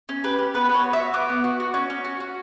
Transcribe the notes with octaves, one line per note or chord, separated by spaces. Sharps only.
C#4
G4 B4
G4
B3 B4
B3
C#5
F#4
E5
F#4
B3 D6
B3
F#4
F#4
C#4
C#4
F#4
F#4